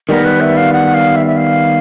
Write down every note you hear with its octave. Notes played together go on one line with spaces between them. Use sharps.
D#3 G3 B3 A#4
B4
E5
F5
F#5
F5
E5
E5
F5